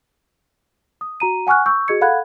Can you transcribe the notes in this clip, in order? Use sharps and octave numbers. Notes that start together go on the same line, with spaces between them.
D#6
F#4 A#5 D#7
F#5 G#5 C#6 F6 F#6
C#6 E6 G6
F#4 G#4 D#5 G#6 C#7
A4 F5 F#5 B5 F#6 G#6